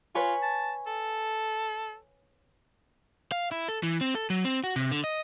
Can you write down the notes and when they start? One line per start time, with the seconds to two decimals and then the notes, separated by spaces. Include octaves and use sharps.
0.15 F4 B4 C#5 G#5
0.43 A5
0.87 A4
3.32 F5
3.52 E4
3.68 A4
3.83 E3
4.01 C4
4.15 A4
4.30 F#3
4.45 C4
4.64 F#4
4.76 C3
4.91 D3
5.04 D#5